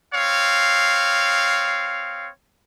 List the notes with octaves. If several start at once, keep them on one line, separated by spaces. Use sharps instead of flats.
C4 C#5 F5